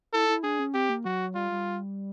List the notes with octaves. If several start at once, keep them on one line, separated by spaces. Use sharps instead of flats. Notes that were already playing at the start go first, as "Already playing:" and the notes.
E4 A4
E4
D4 G#4
C#4
C4 G4
A#3
F#3 F#4
G3 F4
G3